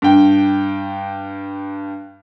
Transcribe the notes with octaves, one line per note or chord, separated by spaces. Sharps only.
G2 G5